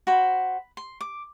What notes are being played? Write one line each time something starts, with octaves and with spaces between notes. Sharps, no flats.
F#4 C5 B5
C6
D6